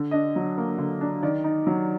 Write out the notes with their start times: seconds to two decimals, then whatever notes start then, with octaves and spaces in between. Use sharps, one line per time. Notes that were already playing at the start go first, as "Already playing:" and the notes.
Already playing: D3
0.11 D4 D#5
0.36 F#3
0.58 A#3
0.78 D3
1.01 D4
1.23 D#3 D5
1.44 D#4
1.67 F#3